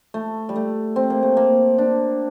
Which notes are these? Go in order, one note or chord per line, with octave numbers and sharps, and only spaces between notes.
A3
G3
A3
C4
A#3
A3
A#3
D4